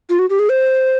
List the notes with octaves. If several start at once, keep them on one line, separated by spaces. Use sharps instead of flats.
F4
F#4
G4
G#4
C5